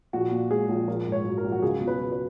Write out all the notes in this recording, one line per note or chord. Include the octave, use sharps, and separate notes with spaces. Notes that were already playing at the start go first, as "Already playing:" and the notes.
A#1 F#4
A#2
G#3 G#4
A#1
A#1 A#4
G#2
C#5
F#3
A#4
A#1
F#4
C#2 G#4
B2
B4
F#3
B4